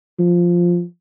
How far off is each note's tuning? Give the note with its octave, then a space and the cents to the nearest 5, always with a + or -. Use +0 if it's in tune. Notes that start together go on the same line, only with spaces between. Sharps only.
F3 +0